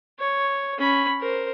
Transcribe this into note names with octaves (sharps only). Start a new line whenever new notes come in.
C#5
C#4 B5
A#4 C5